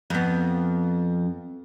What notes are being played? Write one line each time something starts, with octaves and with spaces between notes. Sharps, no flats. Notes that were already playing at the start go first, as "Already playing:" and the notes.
F2 B3